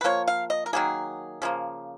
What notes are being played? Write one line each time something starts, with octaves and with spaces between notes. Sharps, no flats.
B4
F3 A#3 C#5
F5
D#5
A#4
D#3 F#3 A#3 G#4
C#3 F3 A#3